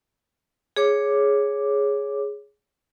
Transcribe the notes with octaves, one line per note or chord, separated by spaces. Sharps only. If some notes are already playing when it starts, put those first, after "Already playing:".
G#4 C#5 D6